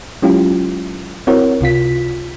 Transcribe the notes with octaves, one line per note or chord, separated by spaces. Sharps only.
F#3 G#3 C#4 E4 F4 G4
C4 E4 F#4 A#4 C#5
C#2 C3 F4 B6